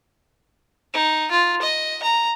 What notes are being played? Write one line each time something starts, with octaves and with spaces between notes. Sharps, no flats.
D#4
F4
D#5
A#5